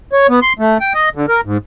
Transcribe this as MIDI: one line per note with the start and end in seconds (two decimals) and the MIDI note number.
0.13 0.27 73
0.29 0.40 59
0.42 0.53 84
0.59 0.78 57
0.81 0.93 79
0.94 1.09 75
1.16 1.26 50
1.29 1.41 70
1.45 1.57 44